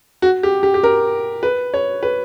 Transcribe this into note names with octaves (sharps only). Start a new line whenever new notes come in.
F#4
G4
G4
G4
A#4
B4
C#5
B4